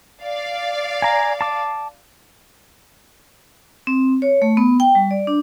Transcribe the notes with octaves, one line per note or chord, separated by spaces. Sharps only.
D5 F5
G#5 A#5
A5 D6
C4
C#5
A3
B3
G5
G3
D5
D4